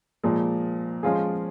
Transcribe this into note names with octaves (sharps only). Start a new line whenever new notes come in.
A#2 F3 G#3
F3 G#3 C#4 F4 G#4